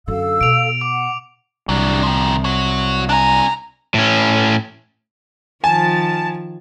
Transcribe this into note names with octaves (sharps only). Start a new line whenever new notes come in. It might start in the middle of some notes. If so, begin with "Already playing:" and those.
F#2 D3 A4 F5 E6
B2 D7 F7
F#5 D6
C2 F#3 D4
D#3 F3
F#4 C#5
D4 G#5 A#5
A2 C#4
D#3 F3 G#5 A5